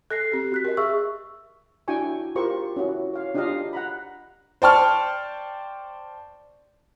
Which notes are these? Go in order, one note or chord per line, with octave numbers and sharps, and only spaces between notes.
A4 F#6 A#6 C7
C4 G4
F#4 F#6 B6
G4 A#4 D#5
G#4 E5 C#6 E6
D4 E4 F#4 G5 G#5 C#6
F4 G4 A#4 C5 C#6
C#4 E4 F#4
C#5 F5
D4 D#4 F4 G4 D#5 F5
F#5 A#5 B5
C5 D5 G5 A5 C#6 F6